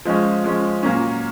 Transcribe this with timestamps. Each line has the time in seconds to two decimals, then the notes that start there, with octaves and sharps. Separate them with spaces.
0.05 F3 G#3 C#4
0.44 F3 G#3 C#4
0.83 A#2 F#3 A#3 C#4